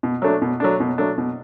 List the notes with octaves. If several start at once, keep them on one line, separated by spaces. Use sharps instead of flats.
B2
F#3 A3 D4
B2
F#3 A3 D4
B2
F#3 A3 D4
B2